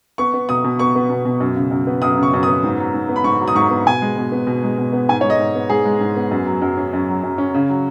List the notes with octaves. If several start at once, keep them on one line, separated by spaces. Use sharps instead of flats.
B3 C#6
B3
B2 D#6
B2
B3 C#6
B3
B2
B2
F#2
C#3
F#2
B3
F#2 D#6
C#3
C#6
F#2
B3 D#6
G#2
F#3
G#2
B3
B5
G#2 C#6
F#3
D#6
G#2 C#6
B3
B2 G#5
G#3
B2
B3
B2
G#3
B2
B3
G#2 G#5
G#3 C#5
D#5
G#2
B3
G#2 G#4
G#3
G#2
B3
F#2
F#3
F#2
C#4
F#2
F#3
F#2
C#4
C#3
F#3